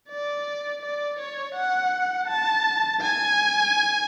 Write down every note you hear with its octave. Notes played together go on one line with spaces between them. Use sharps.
D5
D5
C#5
F#5
A5
G#5